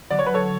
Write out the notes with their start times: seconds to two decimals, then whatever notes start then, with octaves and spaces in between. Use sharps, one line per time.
0.10 D3 F#3 B3 D5
0.19 C#5
0.26 B4
0.34 A4 C#5